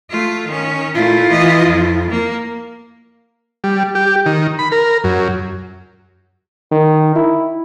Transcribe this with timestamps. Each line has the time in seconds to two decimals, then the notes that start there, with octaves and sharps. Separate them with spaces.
0.10 A3 F4
0.46 D#3 C#4
0.95 A#2 A3 E4 F4
1.28 E3 D#5
1.66 F2
2.10 A#3
3.64 G3
3.95 G4
4.26 D#3
4.59 B5
4.72 A#4
5.04 F#2
6.72 D#3
7.16 E4